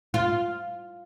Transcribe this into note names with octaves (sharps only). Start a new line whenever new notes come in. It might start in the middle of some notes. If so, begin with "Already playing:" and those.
F4